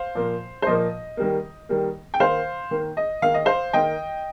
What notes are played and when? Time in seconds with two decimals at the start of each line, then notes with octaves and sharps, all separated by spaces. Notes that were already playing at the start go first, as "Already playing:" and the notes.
Already playing: C5 F5
0.15 A#2 F3 A#3
0.62 C5
0.67 A#2 F3 A#3 D#5
1.17 D#3 G3 A#3
1.69 D#3 G3 A#3
2.14 G5
2.20 D#3 A#3 C5 F5
2.71 D#3 A#3
2.97 D#5
3.22 D#3 A#3 F5
3.34 D#5
3.45 C5 F5
3.73 D#3 A#3 D#5 G5